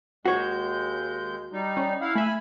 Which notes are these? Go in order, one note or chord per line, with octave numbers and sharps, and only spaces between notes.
D#2 G#3 F#4 C#5 G6
G3 D#4
C#4
E4 F5 F#5
A3 E5 G#5 B5